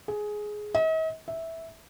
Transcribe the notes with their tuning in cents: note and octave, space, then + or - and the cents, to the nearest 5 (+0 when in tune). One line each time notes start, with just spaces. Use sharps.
G#4 +10
D#5 +45
E5 -10